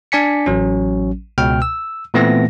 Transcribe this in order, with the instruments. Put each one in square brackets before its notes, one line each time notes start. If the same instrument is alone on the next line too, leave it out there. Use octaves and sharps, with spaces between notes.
[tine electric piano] D4 D5 G#5 B6 C#7
A1 F#3 C#4
C#2 B2 G5 F6
E6
A#2 E3 A3 B3 C4 A#6